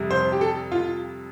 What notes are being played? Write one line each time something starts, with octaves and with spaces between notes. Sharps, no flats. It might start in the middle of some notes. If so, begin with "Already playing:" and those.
Already playing: F2 C3 G3
C5
G4
A4
F4